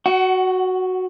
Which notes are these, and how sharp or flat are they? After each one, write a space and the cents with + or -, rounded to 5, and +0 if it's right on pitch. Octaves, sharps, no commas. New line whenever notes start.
F#4 +0 F#5 +30